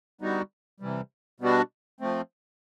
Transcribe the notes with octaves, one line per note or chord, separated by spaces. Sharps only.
D3 G3 B3 D#4 F#4
C3 E3 G3
B2 G3 B3 D4 F#4
F3 A3 C4